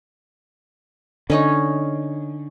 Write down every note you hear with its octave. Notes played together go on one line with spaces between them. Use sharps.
D3 C#4 D#4 C#5